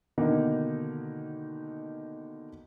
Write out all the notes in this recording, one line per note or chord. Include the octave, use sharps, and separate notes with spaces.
B2 D3 D#3 A#3 D#4